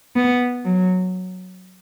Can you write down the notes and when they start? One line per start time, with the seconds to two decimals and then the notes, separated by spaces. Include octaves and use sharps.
0.16 B3
0.65 F#3